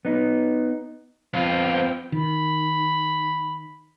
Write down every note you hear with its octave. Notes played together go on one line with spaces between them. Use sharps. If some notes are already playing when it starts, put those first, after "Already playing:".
B3 D#4
F2 B3 C4 F4 F5 G5
D#3 B5